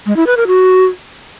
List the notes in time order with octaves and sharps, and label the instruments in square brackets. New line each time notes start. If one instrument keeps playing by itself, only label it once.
[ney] G#3
E4
B4
A#4
F#4